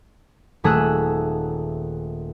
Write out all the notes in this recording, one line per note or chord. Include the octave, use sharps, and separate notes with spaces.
D#1 A3 G#4 E6 F#6